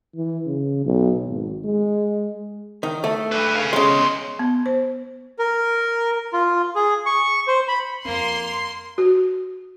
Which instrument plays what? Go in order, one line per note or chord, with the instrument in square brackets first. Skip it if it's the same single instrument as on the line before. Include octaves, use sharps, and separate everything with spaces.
[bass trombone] E3
C#3
B1
G#1
G#3
[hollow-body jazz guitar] D#3
A3
[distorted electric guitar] D4 B4
G#4 F5
[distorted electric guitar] E2 C6 [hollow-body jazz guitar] C#3 G#3
[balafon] B3
C5
[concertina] A#4
F4
G#4
C#6
C5
B5
[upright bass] F2 C4 [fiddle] A#3 [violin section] C6
[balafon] F#4